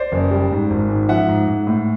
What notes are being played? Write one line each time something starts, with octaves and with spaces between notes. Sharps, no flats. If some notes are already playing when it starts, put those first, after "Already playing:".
Already playing: C5 D5
F#1
G3
G#2
G#1
G#2
F3 E5 F#5
G#2
G#2
A2